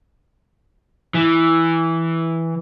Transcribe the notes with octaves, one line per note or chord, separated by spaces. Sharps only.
E3